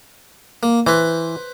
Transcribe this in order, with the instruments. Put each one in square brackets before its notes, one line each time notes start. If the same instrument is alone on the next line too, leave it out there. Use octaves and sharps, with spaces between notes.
[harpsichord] A#3
[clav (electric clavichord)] E3 [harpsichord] B4 C5